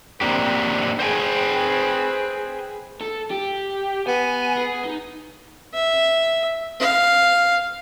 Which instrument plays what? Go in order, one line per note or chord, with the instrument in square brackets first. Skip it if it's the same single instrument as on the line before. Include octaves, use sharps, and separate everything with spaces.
[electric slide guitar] A#3 D4 G4 [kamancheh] C4
[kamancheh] G#4 B4 [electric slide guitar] C5 G5 G#5
[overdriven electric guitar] A4
G4
[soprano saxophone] B3 [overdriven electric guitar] G#5
[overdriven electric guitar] G#4
D#4
[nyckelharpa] E5
F5